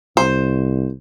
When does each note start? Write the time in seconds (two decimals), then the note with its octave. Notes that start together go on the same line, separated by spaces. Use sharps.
0.17 C2 C5